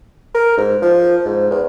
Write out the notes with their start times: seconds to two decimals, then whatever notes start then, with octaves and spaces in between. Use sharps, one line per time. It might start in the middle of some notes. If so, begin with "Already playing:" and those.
0.34 A#4
0.57 G#2
0.82 F3
1.25 G#2
1.51 E2